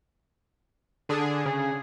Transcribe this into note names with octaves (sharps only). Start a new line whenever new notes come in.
D3 D4 G#4
C#3 G#4